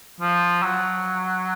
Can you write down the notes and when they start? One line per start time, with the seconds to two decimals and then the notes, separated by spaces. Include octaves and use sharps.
0.21 F3
0.63 F#3